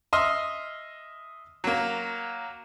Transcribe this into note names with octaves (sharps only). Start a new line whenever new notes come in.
D#5 E5 C6 F6
F#3 A#3